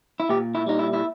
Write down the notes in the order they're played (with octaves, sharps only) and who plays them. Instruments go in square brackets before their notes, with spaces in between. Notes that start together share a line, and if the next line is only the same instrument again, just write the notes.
[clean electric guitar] E4
A#2 G4
E4
G3 D#4
E4
E4